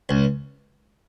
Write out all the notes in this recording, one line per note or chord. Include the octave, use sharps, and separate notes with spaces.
C#2